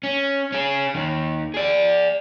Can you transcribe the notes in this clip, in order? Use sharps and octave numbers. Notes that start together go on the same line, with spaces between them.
C#4
C#4 G#4
D#2 D#3
G#4 D5